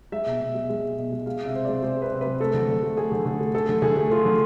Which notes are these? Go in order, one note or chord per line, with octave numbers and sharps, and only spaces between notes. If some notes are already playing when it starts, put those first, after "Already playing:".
G#3 E5
B2
B2
G#3
G#3
B2
B2
G#3
G#3 F5
C3
E5
C3 C5
G#3 D5
G#3 C5
C3 B4
C3
B4
G#3
A3 A4
D3
D3
A3
A3 G#4
D3
D3
A3
A3 A4
D3
D3 G#4
A3
A3 F4
D3